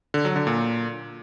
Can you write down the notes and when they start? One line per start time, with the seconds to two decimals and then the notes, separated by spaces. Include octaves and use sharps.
0.14 D3
0.25 F#3
0.36 D3
0.47 A#2